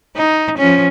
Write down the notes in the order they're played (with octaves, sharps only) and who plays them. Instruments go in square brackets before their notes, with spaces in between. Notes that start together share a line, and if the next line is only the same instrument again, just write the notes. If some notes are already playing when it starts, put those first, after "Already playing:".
[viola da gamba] D#4
F3 C#4